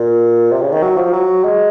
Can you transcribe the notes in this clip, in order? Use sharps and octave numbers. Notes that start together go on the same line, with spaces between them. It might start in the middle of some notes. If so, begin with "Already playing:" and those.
Already playing: A#2
C3
C#3
D#3
F#3
F3
F#3
G#3